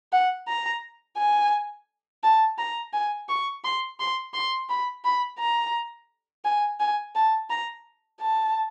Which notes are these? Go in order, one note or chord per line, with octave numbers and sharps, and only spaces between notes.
F#5
A#5
G#5
A5
A#5
G#5
C#6
C6
C6
C6
B5
B5
A#5
G#5
G#5
A5
A#5
A5